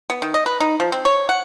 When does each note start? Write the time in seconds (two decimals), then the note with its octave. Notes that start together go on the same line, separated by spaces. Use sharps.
0.10 B3
0.22 D#3
0.34 D#5
0.46 B4
0.60 D#4
0.80 F3
0.92 C4
1.05 C#5
1.29 F#5